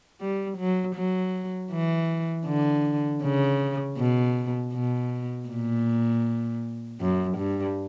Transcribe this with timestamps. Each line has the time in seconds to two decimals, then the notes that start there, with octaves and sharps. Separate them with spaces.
0.21 G3
0.58 F#3
0.96 F#3
1.72 E3
2.47 D3
3.23 C#3
3.98 B2
4.74 B2
5.48 A#2
7.00 F#2
7.38 G2